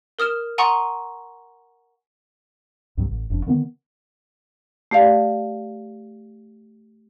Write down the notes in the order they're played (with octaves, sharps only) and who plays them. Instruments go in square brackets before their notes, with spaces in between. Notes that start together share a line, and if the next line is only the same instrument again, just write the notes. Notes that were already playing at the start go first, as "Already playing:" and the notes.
[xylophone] A#4 D#6 F6 E7
F#5 G#5 A#5 C6 C#6 D#6
[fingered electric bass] C2 G2 F#3
A1
F#1 F2 D4
D3 D#3 A#3 B3
[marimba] A3 G4 D5 F5